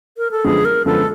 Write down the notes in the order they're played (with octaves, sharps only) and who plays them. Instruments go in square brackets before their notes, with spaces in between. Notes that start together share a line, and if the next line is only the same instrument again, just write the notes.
[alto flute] A#4
A4
[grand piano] F#2 D3 F3 G#3 B3 [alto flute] G#4
[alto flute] A#4
[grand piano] F#2 D3 F3 G#3 B3 [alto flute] A4